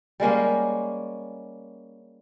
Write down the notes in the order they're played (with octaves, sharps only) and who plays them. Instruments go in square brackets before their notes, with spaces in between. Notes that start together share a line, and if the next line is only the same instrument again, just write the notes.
[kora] G3 G#3 A#3 C#4